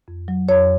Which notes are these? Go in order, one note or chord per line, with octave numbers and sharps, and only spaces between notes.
F2
F#3
F2 C#5